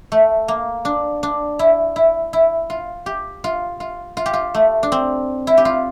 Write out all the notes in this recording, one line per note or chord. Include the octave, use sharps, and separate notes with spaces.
A3
A#3
D4
D4
E4
E4
E4
F4
G4
F4
F4
F4
G4
F4
A3
D4
C4
E4
G4
F4